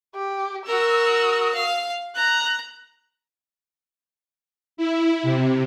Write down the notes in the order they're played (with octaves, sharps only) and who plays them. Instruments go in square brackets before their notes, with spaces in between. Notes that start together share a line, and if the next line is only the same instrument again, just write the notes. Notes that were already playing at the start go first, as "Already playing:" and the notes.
[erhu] G4
[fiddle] F#4 A#4 [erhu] E6
[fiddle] F5
[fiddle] A#5 [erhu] F#6
[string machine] E4
C3